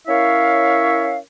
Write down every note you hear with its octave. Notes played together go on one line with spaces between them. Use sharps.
C#4 E4 A#4 C#5 E5 F5